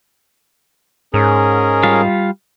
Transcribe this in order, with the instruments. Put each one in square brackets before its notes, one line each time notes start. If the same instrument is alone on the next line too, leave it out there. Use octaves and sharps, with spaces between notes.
[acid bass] G#2 [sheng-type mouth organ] C#4 G#4 A#4
[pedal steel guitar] G3 F4 F5